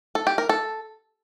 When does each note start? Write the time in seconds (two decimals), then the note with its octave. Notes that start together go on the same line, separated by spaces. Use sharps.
0.15 A4
0.27 G4
0.38 A#4
0.49 A4